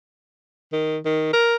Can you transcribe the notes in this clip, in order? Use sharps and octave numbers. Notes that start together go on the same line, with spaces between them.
D#3
D#3
A#4